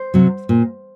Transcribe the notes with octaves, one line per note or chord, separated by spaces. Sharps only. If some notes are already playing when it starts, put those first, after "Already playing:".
Already playing: C5
C3 F#3
A#2